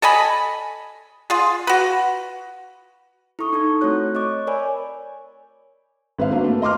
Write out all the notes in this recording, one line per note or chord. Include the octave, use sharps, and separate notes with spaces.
A4 D#5 G#5 B5
F4 G#4
F#4 B4
E4 A4 C#6 D#6
D#4 A4 C#6 G#6
A3 C4 F#4 C#5 F#6
C#5 D#5 C#6 D6
A#4 C#5 D5 G#5 B5
G#1 B4 E5 F5
A#3 D4 F#4 B4
A3
D#5 C6 D6 F6